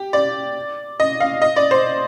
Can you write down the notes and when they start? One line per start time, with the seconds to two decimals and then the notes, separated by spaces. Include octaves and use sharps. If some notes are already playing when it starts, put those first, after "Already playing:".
Already playing: G4
0.13 D5
1.00 D#5
1.20 F5
1.42 D#5
1.56 D5
1.71 C5